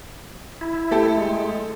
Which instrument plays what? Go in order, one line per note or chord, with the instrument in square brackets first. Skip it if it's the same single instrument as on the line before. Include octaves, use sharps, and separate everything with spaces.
[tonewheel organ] E4
[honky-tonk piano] A3 G4 A4
[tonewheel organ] G#3